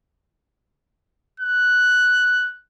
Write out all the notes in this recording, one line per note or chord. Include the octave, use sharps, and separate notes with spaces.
F#6